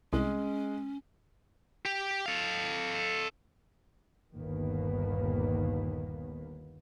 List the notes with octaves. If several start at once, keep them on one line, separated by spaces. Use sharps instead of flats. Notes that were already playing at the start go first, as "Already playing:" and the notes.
C2 G#3 C#4 D#5
G4
A4 F5
G1 D#2 A#2 D#3 A#3 B3